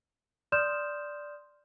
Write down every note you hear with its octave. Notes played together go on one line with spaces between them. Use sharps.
D5 C6 D#6 F6 G6 E7